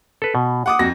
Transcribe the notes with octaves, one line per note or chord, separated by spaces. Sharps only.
A4 B4
B2
F#5 D6 D#6
F2 F#4 A#6